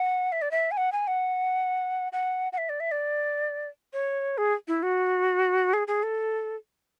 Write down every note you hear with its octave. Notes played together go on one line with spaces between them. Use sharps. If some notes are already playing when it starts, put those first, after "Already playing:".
Already playing: F#5
E5
D5
E5
G#5
F#5
G#5
F#5
F#5
F#5
E5
D5
E5
D5
C#5
G#4
E4
F#4
G#4
G#4
A4